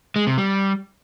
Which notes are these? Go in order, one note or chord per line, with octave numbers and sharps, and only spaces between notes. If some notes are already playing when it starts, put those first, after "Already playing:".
G#3
C3
G3